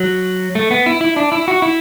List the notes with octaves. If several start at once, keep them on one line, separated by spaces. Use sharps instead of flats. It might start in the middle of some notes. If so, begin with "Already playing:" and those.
Already playing: F#3
A3
B3
E4
E4
D4
E4
F#4
E4